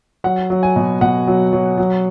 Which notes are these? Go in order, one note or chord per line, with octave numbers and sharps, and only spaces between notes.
F#3 F#5
F#3
G#5
B2
B2 F#5
F#3
F#3
F#3